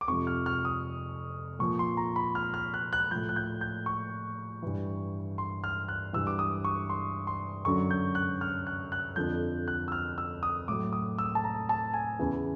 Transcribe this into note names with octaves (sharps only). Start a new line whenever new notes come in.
D6
F2 C3 F3 C#6
F6
F6
D#6
A#2 F3 C#6
C6
A#5
B5
F6
F6
F#6
F#6
A2 F3 G6
F#6
G6
G6
C#6
G2 E3
C6
F6
F#6
G2 E3 E6
D6
D#6
C#6
C6
C6
F#2 D3 F#3 C#6
G6
F#6
F6
F#6
F#6
F2 D3 F3 G6
F#6
E6
F6
E6
D#6
A2 F#3 D6
D#6
E6
A5
A#5
A5
G#5
E2 C#3 E3